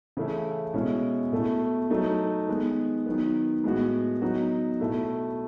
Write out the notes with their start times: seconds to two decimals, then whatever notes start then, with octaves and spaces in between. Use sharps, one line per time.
0.17 C#3 E3 A3 E4
0.74 B2 G#3 C#4 E4
1.32 B2 A3 E4
1.91 F#3 A3 D#4
2.49 D#3 G#3 B3
3.06 D#3 F#3 B3
3.64 A2 G#3 B3 F#4
4.22 F#3 B3 D#4 F#4
4.80 B2 A3 E4